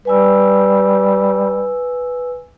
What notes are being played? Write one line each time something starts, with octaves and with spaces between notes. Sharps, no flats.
G3 B4 G#5 E6